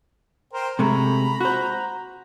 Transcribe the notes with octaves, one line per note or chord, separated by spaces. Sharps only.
A#4 C5 G5
C3 G#3 A3 A#5 B5
F#4 C5